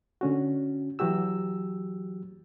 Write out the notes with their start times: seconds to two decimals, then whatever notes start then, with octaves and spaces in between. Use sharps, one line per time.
0.21 D3 C#4 F#4
0.99 E3 F#3 F#4 G4 E6